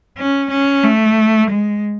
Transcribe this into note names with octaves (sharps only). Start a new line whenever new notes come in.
C#4
C#4
A3
G#3